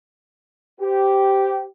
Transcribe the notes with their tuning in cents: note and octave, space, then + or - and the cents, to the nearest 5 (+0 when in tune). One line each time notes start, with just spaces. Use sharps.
G4 -10 C5 -15